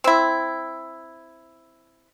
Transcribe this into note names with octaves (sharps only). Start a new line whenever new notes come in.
C4 E4